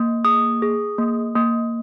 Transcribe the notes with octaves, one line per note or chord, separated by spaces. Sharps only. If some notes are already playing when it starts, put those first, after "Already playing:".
Already playing: A#3
G#4 D#6
G#4
A#3
A#3